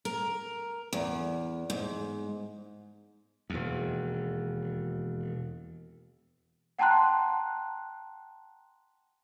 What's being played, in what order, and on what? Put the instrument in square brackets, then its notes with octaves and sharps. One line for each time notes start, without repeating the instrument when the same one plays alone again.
[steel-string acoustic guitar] A#4
E2
G#2
[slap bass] E1 D#2
[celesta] F#5 G5 A5 A#5 C6 F#6